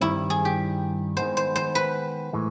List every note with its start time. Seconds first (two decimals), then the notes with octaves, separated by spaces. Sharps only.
0.01 G2 D#3 G3 C4 E4
0.30 G#4
0.45 G4
1.17 D#3 G#3 B3 C5
1.37 C5
1.56 C5
1.75 B4
2.33 A2 E3 G#3